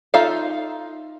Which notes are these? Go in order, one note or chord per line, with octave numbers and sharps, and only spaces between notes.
D#4 F4 A4 E5 F5